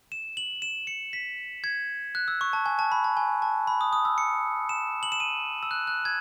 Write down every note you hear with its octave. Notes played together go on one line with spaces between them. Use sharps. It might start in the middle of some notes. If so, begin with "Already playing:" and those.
E7
F#7
E7
C#7
B6
G#6
F#6
E6
C#6
A5
G#5
A5
B5
A5
G#5
A5
B5
D#6
D#6
E6
C#7
E7
F#7
E7
D#7
E6
F#6
F#6
G#6